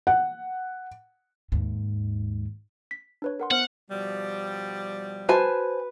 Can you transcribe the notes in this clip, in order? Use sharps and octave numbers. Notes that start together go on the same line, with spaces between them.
F#5
D#2 G#2
B6
D4 B4 C#5
A#4 F#5 C6
B3 C5 F#5 F6
B2 F3 G3
F#4 B4 C5 G#5 A5